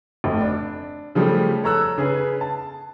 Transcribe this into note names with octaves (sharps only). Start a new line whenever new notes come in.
F1
D4
C#3 F3 G3 A3
A4 C#5 A#5 E6 F#6
C#3 G#4 B4
A5